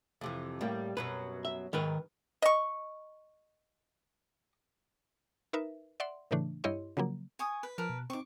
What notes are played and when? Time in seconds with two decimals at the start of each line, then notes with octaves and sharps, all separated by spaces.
0.21 F2 C3 E3
0.61 A2 G3 A#3
0.97 F#2 B2 F#3 B4
1.45 E5
1.73 G#2 D#3 A#4 B4
2.42 D#5 C#6
5.53 D#4 A#4 B4 E5
6.00 D5 E5 F#5 C6
6.31 A2 C#3 E3 A3 D4
6.64 G2 E4 G4 C#5 D#5 C6
6.97 C#3 F3 F#3 A#3
7.39 G#5 C#6 D#6
7.63 B4
7.78 F3 A#4 B4 A5
7.89 B2
8.10 C4 D#4 C#6 D6